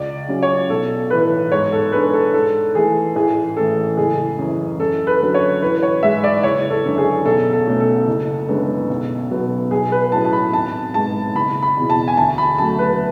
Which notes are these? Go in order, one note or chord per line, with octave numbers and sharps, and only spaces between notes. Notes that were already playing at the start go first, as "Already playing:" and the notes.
Already playing: C#2 D5
C#3 F#3 C#4
C#5
B1 A4
A2 E3 B4
G#2 C#5
A4
G#3 D4 B4
A4
G#2 A4
E3 A3 G#4
A1 G#4
A2 E3 A3 C#4 A4
F#1 G#4
F#2 E3
F#2 A4
B4
D3 F#3
C#5
A1 B4
C#5
G#2 G#3 E5
D5
F#1 C#5
A4
F#2 D3
G#4
B1 A4
A4
B2 A3 C#4
A4
F#1
F#2 D3 G#3 B3
B1
B2 F#3 B3
B1 G#4
B4
A2 F#3 C#4 A5
A5
B5
G#1 A5
G#2 G#3 B3 A5
F#1 B5
B5
E2 B2
A5
G#5
D2 A5
B5
C#3 F#3 A3 A5
B4